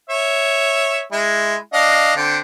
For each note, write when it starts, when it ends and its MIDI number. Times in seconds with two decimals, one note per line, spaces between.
0.10 1.02 73
0.10 1.02 76
1.12 1.56 56
1.12 1.56 64
1.73 2.12 62
1.73 2.12 75
1.73 2.12 77
2.16 2.38 50
2.16 2.38 60